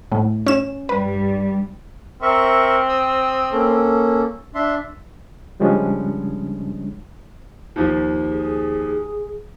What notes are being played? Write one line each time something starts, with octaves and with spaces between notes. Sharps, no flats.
A2
C#4 E7
G2 G3 B4
C4 A#4 E5 C#6
D#6 E6
A#3 C#4 A4
D4 E5 C6
C#3 F3 G3 G#3 C#4 D4
D#2 F3
G#4